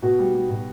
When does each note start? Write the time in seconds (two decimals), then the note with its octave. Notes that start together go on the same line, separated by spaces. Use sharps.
0.02 B2 F#4
0.19 G3
0.34 G3
0.50 B2